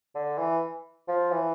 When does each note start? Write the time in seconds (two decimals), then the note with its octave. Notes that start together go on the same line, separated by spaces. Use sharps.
0.15 D3
0.38 E3
1.08 F3
1.31 E3